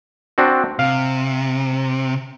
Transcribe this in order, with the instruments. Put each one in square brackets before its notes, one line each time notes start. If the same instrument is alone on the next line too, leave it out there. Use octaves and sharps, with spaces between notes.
[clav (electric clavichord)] C4 D4 F#4
[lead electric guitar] C3 [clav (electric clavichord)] F5